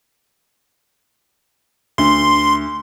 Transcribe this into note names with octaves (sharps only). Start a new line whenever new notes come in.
D2 C6